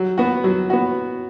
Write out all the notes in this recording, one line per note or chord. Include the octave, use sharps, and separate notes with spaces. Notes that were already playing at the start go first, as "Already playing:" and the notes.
Already playing: F#3
B3 F#4
F#3
B3 F#4